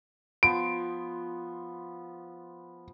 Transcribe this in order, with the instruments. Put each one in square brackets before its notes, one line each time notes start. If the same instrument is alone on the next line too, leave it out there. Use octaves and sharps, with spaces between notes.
[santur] F3 B3 C6 [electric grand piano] D7